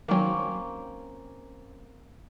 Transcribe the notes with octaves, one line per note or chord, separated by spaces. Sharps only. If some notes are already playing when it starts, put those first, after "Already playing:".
D#3 F#3 A#3 C4 C#4